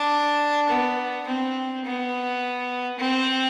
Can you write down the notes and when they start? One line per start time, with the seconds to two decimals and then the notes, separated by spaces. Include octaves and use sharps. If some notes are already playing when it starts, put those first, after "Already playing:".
Already playing: D4
0.69 B3
1.27 C4
1.85 B3
2.99 C4